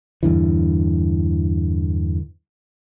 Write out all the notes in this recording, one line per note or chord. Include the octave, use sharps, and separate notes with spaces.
E2 G2 D3 E3